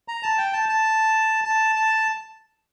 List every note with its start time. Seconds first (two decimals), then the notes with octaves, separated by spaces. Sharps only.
0.08 A#5
0.23 A5
0.38 G5
0.53 A5
0.69 A5
1.45 A5
1.76 A5